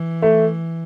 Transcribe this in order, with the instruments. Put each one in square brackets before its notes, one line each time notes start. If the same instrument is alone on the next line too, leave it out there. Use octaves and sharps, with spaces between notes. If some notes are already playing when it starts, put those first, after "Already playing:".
Already playing: [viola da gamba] E3
[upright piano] A3